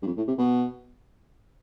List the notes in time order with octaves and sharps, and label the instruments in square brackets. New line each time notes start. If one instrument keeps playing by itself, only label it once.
[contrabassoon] G2
F2
A2
C3
B2